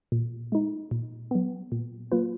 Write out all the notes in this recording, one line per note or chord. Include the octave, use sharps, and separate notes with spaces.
A#2
G#3 D#4
A#2
F#3 B3
A#2
F#3 A#3 F4 B4